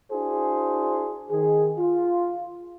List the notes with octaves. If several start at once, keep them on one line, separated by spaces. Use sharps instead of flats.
D4 E4 F#4 G#4 C5
D#3 G#4
F4